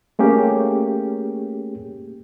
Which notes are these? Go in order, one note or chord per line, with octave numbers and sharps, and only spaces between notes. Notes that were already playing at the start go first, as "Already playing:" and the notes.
A3 A#3 C#4 G4 G#4